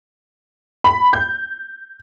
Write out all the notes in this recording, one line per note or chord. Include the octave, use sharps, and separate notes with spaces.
B5
G6